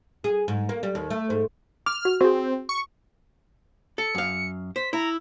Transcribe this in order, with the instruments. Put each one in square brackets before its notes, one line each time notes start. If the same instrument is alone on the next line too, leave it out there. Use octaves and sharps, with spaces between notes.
[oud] G#4
G#2
A#3
G3
D#2
A3
G#2
[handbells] D6 [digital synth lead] F6
[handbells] F#4
[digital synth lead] C4 [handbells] F#4 G#4
[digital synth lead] C#6
[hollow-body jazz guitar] A4 [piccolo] C#7
[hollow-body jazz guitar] F#2 F5
[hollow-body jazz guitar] C5 [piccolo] B6
[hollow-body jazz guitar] E4 [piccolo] A#5